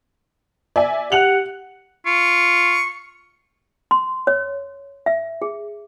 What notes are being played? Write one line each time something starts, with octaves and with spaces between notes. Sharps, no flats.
D5 E5 G#5
G4 F#5 F#6 F7 F#7
F4 C#6
C6
C#5
E5
G#4